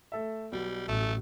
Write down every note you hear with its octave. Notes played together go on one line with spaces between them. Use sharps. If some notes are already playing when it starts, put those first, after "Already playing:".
A3 A4 E5
B1 B2 G3
A1 A3